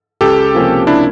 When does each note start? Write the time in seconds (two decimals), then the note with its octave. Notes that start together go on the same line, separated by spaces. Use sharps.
0.21 C#2 G4 A4
0.54 C3 F3 A#3 C#4
0.87 D4 E4